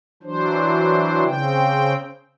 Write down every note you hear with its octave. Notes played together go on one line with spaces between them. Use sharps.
E3 F#3 D4 C5
C#3 C4 G5